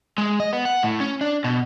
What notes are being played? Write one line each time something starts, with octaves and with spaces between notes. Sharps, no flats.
G#3
D#5
B3
F#5
A2
C#4
D4
B2